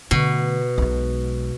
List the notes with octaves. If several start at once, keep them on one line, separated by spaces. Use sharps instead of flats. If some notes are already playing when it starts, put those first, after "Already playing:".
B2 D3 A3
B1 G#3